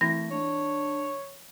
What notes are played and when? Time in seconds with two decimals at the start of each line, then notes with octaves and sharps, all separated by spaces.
0.01 E3 A3 C4 E4 A#6
0.31 D4 C#5